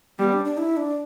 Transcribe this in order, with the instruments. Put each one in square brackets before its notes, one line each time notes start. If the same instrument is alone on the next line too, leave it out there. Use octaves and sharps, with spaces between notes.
[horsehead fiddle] G3 [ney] B3
[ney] D4
D4
E4
D4